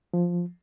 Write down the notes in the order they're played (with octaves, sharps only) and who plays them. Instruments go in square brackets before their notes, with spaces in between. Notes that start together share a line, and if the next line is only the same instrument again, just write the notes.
[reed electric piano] F3